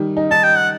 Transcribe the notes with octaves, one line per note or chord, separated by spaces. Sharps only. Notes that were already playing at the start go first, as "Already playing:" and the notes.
Already playing: D#3 G3
D#4
D#4 A5
G5
F#5